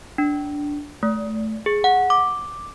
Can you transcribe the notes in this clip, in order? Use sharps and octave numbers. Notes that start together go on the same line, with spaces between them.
D4
A3
G#4
F#5
D6